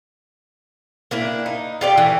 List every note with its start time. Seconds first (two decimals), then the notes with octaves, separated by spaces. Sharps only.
1.11 A#3 D4 E4
1.46 D#4
1.81 F4 G4 D5
1.97 E3 A3